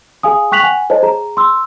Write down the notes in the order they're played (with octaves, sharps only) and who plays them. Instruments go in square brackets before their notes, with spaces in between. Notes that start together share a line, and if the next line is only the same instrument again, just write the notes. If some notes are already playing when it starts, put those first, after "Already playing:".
[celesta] G#4 F5 G#5 D#6
G5 C#6 F#6 B6 F7 F#7
F#5 G#5
A4 C5 C#5 D#5 A5
G#4 A#5
C6 E6